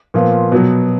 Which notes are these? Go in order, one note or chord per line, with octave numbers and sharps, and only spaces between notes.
A#2 F3 B3 F4
B2 F#3 B3